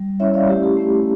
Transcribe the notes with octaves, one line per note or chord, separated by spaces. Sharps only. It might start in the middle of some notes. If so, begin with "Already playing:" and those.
Already playing: G3
G3 C#4 E4 C#5 E5
D5 F5
A3 C#4 E4 G4
G4
A3 C#4 E4